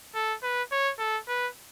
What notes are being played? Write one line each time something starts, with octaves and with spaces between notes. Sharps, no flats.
A4
B4
C#5
A4
B4